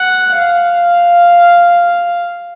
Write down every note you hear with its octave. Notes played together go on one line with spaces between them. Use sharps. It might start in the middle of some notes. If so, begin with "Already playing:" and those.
Already playing: F#5
F5